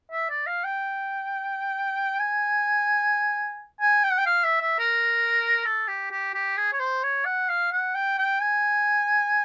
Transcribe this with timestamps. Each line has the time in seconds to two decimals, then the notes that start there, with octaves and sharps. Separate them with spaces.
0.12 E5
0.29 D5
0.47 F5
0.64 G5
2.20 G#5
3.81 G#5
4.04 G5
4.11 F#5
4.18 G5
4.26 F5
4.44 E5
4.61 E5
4.79 A#4
5.65 A4
5.88 G4
6.11 G4
6.34 G4
6.57 G#4
6.73 C#5
6.79 C5
7.03 C#5
7.26 F#5
7.49 F5
7.72 F#5
7.95 G5
8.18 G5
8.41 G#5